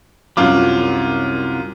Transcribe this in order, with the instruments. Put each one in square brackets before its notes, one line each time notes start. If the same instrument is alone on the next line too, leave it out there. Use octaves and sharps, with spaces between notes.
[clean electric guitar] C2 F#3 [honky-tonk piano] F#2 F4 D6